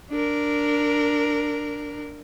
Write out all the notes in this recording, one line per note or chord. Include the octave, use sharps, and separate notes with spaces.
D4 A#4